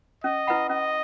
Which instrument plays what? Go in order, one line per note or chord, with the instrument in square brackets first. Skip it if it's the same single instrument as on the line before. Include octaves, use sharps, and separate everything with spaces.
[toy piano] C#4 [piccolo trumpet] D#5
[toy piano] E4 B4 F#5 B5
[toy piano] C#4 [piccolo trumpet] D#5